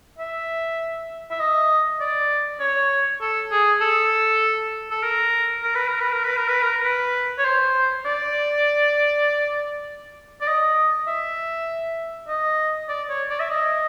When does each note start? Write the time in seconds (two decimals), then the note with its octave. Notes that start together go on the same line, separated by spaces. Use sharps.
0.18 E5
1.31 E5
1.40 D#5
2.01 D5
2.60 C#5
3.21 A4
3.51 G#4
3.81 A4
4.91 A4
5.03 A#4
5.63 A#4
5.75 B4
5.87 A#4
6.00 B4
6.12 A#4
6.24 B4
6.37 A#4
6.49 B4
6.62 A#4
6.84 B4
7.39 C#5
7.45 C5
8.06 D5
10.41 D5
10.48 D#5
11.07 E5
12.28 D#5
12.89 D5
13.09 C#5
13.30 D5
13.40 E5
13.50 D#5